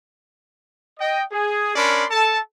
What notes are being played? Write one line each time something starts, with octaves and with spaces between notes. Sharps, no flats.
D#5 G5
G#4
C#4 D4 A#4 D5 B5 C6
A4 A5